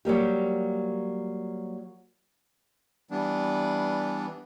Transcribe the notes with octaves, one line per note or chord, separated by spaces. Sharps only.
F#3 G3 A#3 G4
E3 G3 B3 D4